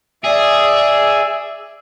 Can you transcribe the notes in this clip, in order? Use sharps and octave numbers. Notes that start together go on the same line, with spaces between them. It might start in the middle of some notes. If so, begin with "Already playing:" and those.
G#4 D5 E5